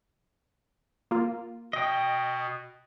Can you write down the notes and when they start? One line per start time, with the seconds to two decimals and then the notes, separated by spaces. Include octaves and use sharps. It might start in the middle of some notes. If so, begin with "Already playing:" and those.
1.11 A#3 F4
1.73 B2 D#5 G5